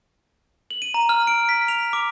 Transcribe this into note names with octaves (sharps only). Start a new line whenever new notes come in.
F#7
D#7
A#5
F6
D7
B6
F7
D6